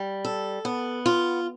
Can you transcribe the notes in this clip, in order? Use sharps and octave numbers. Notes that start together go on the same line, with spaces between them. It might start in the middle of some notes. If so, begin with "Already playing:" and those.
Already playing: G3
A4
B3
F4